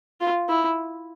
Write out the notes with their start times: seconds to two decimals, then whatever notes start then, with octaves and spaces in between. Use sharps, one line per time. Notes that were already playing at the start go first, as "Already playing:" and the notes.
0.21 F4
0.49 E4